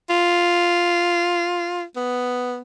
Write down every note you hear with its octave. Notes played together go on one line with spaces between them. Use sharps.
F4
B3